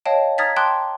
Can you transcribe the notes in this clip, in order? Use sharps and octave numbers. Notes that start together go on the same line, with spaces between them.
C#5 D#5 F5 G5 A5
A#5 D#6 F6 G#6 A6 B6
G5 A5 C6 D6 D#6 F#6